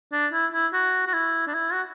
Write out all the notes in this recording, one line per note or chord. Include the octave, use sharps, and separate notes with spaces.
D4
E4
E4
F#4
F#4
E4
D4
E4
F#4